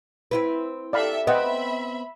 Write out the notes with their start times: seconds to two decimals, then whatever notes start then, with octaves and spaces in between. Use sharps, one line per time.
0.31 C4 E4 B4
0.93 G4 A4 D5 E5 F5 B5
1.27 B3 C4 D#5 E5 F#5 G5 B5